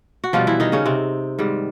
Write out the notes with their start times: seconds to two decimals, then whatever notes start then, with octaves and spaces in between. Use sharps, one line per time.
0.24 F#4
0.33 B2 F3 G3 F4
0.47 E3 E4
0.60 D#3 D#4
0.72 C#3 C#4
0.86 C3 C4
1.39 G#2 D#3 G3